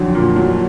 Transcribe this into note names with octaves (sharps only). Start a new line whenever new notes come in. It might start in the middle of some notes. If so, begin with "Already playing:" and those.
Already playing: F2 D3 F#3
A#2
F#3